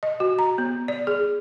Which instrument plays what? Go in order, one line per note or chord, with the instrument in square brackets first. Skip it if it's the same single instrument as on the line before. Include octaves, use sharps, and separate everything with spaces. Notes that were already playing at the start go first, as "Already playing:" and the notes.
[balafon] D#5
F#4
A#5
B3
D5
G#4